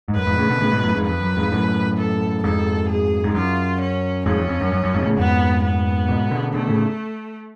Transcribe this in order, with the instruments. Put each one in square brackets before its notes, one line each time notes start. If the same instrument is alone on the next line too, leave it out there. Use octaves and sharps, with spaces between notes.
[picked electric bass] G#2
[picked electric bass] F#2 [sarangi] B4
[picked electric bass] F2 G#2
A2 C#3
B2 D3
A2 C#3
G#2 B2
F#2 A2
F2 G#2
[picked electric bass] F2 [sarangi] B4
[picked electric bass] F#2
F2 G#2
F#2 A2
[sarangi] A4
[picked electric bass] F2 G#2 [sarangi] A4
[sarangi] G#4
[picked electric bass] G#2
[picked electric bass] F#2 [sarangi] F4
[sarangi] C#4
[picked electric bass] F2 G#2 [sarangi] C#4
[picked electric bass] F2
F2
F#2
F#2
F#2
F2 G#2
B2
A2 C#3
[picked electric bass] F2 G#2 [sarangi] B3
[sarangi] B3
[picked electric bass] G#2 B2
B2 D3
[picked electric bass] B2 D3 [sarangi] A3
[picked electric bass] A2 C#3